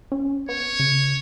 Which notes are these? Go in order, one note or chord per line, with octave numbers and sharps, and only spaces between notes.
C#4
B3 C#5
C#3